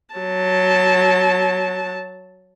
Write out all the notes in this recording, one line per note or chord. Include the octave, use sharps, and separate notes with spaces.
F#3 A5